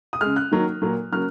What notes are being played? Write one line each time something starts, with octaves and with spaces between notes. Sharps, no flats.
D#6
C#3 G#3 F6
F#6
D#3 F#3 A#3
A#2 F#3 A#3
C#3 F#3 A#3 F6